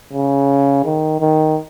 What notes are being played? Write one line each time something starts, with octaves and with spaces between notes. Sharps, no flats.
C#3
D#3
D#3